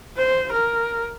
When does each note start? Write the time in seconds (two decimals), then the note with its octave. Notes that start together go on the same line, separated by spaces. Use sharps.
0.17 C5
0.52 A#4